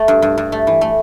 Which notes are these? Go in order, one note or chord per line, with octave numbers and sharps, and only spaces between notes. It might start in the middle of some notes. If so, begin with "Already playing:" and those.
Already playing: A3
G2
G2
G2
A3
E3
A3